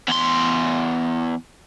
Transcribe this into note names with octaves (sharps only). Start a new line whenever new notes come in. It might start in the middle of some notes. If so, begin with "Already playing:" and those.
E2 C6